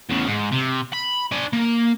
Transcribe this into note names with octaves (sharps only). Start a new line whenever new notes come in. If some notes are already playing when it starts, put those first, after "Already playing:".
E2 C#3
G#2
C3
B5
D4 G#5
A#3